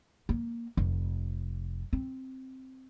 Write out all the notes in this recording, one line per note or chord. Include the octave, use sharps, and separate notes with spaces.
A#3
F1
C4